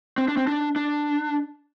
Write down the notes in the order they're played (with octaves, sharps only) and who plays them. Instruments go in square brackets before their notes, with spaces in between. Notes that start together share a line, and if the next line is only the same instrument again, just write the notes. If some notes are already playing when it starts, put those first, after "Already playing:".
[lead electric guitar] C4
D4
C4
D4
D4